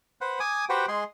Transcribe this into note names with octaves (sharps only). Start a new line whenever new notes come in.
B4 C5 F#5
G#5 D6 D#6
F#4 G4 B4 C5 F#5 G5
G#3 G#4 C6